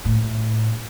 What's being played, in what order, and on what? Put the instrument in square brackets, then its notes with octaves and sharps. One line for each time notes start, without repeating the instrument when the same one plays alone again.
[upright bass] A2